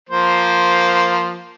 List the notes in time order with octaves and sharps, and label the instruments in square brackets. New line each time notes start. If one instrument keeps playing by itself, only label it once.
[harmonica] F3 A#3 C5